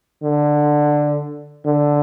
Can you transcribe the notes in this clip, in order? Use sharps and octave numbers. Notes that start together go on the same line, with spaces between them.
D3
D3